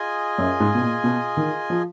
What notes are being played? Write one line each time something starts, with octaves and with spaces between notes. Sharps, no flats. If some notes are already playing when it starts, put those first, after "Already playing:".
Already playing: F4 G#4 D#5 G#5
F#2
G#2
B2
A#2
B2
D#3
F3